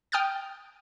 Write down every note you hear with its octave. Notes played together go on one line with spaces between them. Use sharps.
G5 D#6 F6 G6 A6